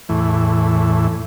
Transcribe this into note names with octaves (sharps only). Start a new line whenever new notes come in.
E2 A2 E3